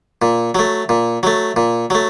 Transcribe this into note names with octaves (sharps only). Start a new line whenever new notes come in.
A#2
F#3 A3
A#2
F#3 A3
A#2
F#3 A3